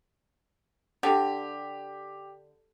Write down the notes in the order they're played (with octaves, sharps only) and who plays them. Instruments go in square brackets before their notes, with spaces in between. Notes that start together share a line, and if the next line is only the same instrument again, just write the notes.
[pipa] D3 [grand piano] G4